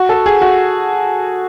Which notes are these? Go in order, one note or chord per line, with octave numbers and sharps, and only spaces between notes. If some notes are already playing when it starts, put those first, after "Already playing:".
Already playing: F#4
A4
G#4
F#4